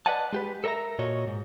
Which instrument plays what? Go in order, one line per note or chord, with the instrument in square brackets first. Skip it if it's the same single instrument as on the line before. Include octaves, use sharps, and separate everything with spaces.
[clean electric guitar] B4 D5 D#5 F#5 G#5 A5
G#3 G4 B4
A4 A#4 D5 E5 A#5
A#2 F#4 C#5 D#5
G#2